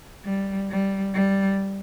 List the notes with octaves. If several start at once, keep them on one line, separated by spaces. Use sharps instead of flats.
G3
G3
G3